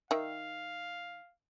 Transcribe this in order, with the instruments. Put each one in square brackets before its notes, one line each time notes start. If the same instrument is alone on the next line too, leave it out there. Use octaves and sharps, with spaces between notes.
[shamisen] D#3 E5 [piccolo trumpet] F5